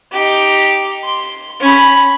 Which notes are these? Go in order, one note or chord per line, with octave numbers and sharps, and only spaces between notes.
D#4 G4
C6
C#4 B5